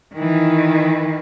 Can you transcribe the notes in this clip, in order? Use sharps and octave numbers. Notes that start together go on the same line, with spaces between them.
D#3 E3